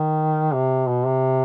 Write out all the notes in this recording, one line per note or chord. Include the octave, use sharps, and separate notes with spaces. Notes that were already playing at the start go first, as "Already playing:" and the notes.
Already playing: D#3
C3
B2
C3